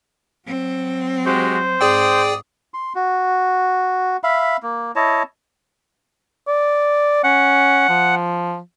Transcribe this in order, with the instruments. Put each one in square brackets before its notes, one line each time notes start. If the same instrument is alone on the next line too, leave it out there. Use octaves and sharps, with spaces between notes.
[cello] F#3 C4
[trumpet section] G#3 F#4 G4 [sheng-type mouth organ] C5
[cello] G#2 [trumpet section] C4 D6 D#6 [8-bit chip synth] G#4 D5 G5
[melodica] C6
F#4
E5 F5 B5
A#3
E4 C#5 D#5 A5
[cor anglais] D5
[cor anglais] C#4 [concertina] F#5
[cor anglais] F3